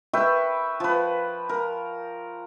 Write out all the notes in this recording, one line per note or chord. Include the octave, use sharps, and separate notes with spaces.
B4 E5 G5 C#6
F3 B4
A#4